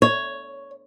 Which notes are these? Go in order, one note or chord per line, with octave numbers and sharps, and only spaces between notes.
C#5